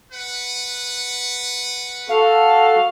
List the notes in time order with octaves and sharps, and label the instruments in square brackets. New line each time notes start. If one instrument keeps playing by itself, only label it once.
[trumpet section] B4 F#5
[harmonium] F#4 A4 [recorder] F5